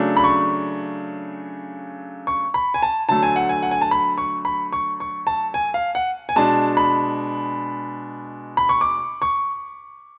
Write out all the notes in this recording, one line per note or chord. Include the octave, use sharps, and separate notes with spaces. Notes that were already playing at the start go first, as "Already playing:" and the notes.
Already playing: C#3 F#3 A3 D4
B5
C#6
C#6
B5
G#5
A5
D3 F#3 A3 A5
G#5
F#5
G#5
F#5
G#5
A5
B5
C#6
B5
C#6
C#6
A5
G#5
F5
F#5
G#5
B2 G#3 D4 A5
B5
B5
C#6
D6
C#6